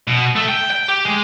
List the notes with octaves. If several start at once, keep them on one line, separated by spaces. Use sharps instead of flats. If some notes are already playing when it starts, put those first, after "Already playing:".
B2
A3
G5
G5
G4
G#3